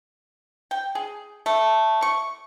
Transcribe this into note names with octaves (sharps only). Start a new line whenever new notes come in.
G5
G#4
A3
C#6